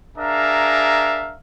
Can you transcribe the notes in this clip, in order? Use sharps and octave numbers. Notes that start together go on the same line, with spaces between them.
D4 G#4 A#4 E5 F5 A#5